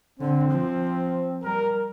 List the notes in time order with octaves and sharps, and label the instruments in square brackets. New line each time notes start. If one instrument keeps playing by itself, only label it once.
[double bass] D3 [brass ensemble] C4
[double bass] F3
[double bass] G3 [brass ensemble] A#4